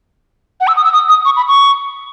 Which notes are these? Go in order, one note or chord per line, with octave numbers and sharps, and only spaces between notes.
F#5
E6
D#6
E6
D#6
D#6
C#6
B5
C#6